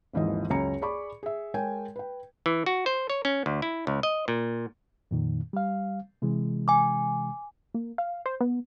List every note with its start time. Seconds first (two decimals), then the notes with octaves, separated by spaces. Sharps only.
0.13 G#1 D#2 G#2 E3 F3 D#5
0.50 C#2 F#2 C#5 G#5 A#5 C#7
0.82 G#4 D5 B5 C#6 D6
1.23 G#4 E5
1.54 G#3 A#4 C#5 G5 G#5
1.96 B4 G5
2.46 E3
2.66 F#4
2.86 C5
3.10 C#5
3.25 C#4
3.46 D2
3.62 E4
3.87 C#2
4.03 D#5
4.28 A#2
5.11 F2 A#2 D#3
5.53 G3 F5
6.22 C3 E3 G#3
6.68 G#5 D6
7.74 A#3
7.98 F5
8.26 C5
8.41 B3